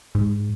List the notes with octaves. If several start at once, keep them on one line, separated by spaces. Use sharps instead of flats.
G#2